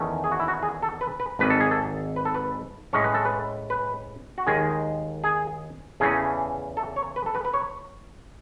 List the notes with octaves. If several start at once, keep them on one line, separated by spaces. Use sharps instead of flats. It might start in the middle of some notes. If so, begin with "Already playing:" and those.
Already playing: E2 D#3 A3 C#4
G#4
F#4
E4
F#4
G#4
A4
B4
B4
G#1 G#2 D#3 B4
A4
G#4
A4
B4
A4
B4
A2 G#3 C#4 C#5
B4
A4
B4
B4
F#4
D#2 D#3 G#3 G#4
G#4
E2 C#3 E3 A3 C#4 G#4
A4
C#5
B4
A4
B4
B4
C#5